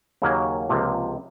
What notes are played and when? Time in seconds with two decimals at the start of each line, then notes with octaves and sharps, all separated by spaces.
0.22 D#2 C#3 F#3 A#3 C#4
0.69 C#2 C3 F3 A#3